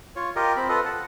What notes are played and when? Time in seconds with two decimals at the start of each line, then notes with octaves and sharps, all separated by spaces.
0.16 F4 C#5
0.36 F4 G4 A#4 D#5
0.56 C4 B5
0.69 F4 A4 B4 D#5
0.85 F#5 A5